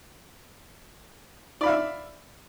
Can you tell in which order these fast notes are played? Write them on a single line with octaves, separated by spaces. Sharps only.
D5 B5 F5 E5